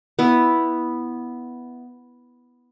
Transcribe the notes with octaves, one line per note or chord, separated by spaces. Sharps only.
B3 E4